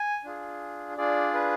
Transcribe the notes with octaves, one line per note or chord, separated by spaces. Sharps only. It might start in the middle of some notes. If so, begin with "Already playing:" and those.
Already playing: G#5
D4 F4 G#4
D4 F4 G#4 D5
B4